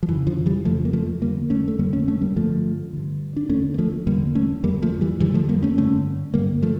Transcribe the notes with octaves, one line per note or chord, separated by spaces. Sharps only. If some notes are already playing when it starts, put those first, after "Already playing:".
F3
F2 C#3 E3
D3 F3
E3 G3
F2 C#3 F3 A3
A#3
F3 A3
F2 D3 G3 A#3
A3 C#4
A3
F2 D3 G3 A#3
A3 C#4
A3 C#4
G3 A#3
G2 D3 F3 A3
G2 D3
D4
E2 D3 A3 C#4
A#3
F3 A3
E2 D3 G3 A#3
A3 C#4
F2 D3 G3 A#3
F3 A3
E3 G3
F2 D3 E3 G3
F3 A3
G3 A#3
A3 C#4
G2 D3 A3 C#4
G2 D3 G3 A#3
F3 A3